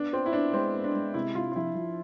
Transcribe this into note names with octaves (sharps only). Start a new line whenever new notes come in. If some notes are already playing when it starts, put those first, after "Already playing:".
Already playing: B3 D4
C4 F4
E4
B3 D4
G#3 C4
B3
D4
G#3
C3 E4
C3 F4
F4
F3 E4
F3